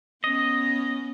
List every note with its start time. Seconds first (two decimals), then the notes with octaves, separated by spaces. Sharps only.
0.24 B3 C#4 D#5